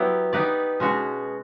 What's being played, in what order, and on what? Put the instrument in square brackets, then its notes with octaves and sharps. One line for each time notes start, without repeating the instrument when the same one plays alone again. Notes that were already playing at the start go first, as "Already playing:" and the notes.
Already playing: [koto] F#3 B3 E4 G4
B3 D#4 G4 B4 D5
B2 G#3 C#4 F#4